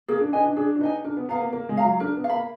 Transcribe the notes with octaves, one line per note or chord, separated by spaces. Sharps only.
A#3 G#4
D4
D4 B4 D#5 G#5
D4
D4 G#4
D4
D#4 B4 D#5 G#5
D4 A#4
B3
B3 F5 A#5
A#3
A#3 A#4
G#3
F5 A#5
F#3
D4 A#4
B3
F5
A#3 B5